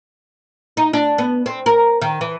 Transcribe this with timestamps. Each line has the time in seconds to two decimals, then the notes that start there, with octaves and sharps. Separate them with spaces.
0.77 D#4
0.93 D4
1.18 B3
1.46 C4
1.66 A#4
2.01 D#3
2.21 E3